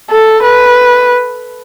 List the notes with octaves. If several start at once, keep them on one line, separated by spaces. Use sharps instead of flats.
A4
B4